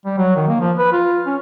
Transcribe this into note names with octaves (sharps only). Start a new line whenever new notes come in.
G3
F#3
D#3
A#3
F3
B4
F4
C#4